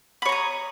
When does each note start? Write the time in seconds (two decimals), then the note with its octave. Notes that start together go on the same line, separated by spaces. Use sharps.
0.22 B5
0.25 C#5
0.29 A#5
0.32 D#6